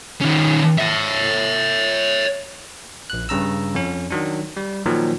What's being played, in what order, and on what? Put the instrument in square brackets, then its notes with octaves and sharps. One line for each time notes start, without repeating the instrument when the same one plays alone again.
[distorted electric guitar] D#3 C#4
C#5 E5
[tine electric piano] A#1 F#6
G2 C#3 A#5 E6
F2 C#4
D#3 F#3 D4
G3
A#2 D#3 F3 F#3